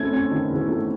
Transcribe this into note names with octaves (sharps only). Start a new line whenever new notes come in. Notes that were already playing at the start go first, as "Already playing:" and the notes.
Already playing: A3 C4 C#4 G#6
C#4
D#3
E2
A3